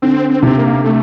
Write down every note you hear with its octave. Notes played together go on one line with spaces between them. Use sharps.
D3 C4
C4
C3 C4
A#3
A3